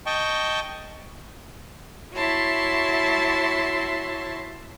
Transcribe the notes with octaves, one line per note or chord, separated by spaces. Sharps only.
D#5 G5 A5 C#6
E4 F#4 C#5 E5 A5 C6